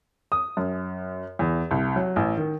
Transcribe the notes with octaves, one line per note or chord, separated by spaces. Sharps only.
D#6
F#2
E2
C2
F#3
A1
D#3